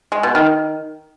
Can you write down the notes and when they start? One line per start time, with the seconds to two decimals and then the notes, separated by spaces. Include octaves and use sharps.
0.12 G#3
0.23 B2
0.35 D#3